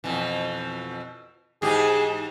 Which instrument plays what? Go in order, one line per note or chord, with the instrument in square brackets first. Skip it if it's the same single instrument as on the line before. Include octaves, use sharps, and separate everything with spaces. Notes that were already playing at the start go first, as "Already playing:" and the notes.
[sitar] F2 B2 E3
[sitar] G#2 E3 G4 [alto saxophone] G#4